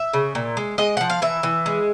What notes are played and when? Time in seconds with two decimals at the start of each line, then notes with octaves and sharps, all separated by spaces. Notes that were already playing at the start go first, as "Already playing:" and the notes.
Already playing: E5
0.13 C#3
0.35 A#2
0.57 G#3
0.78 G#3 D#5
0.97 F3 F#5
1.10 F5
1.22 E3 E5
1.43 E3
1.66 G#3